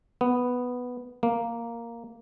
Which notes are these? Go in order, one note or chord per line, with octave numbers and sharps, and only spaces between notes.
B3
A#3